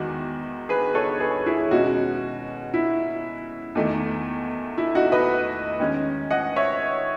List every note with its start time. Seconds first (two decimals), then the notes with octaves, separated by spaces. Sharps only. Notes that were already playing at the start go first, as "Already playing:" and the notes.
Already playing: E2 D#3 G#3 D#4 F#4
0.69 G#4 B4
0.95 A4 C#5
1.20 G#4 B4
1.46 E4 G#4
1.71 B2 G#3 C#4 D#4 F#4
2.74 E4
3.75 E2 D#3 A3 D#4
4.78 E4
4.95 D#4 F#4
5.12 B4 D#5
5.80 D#3 G#3 C#4
6.31 D#5 F#5
6.56 C#5 E5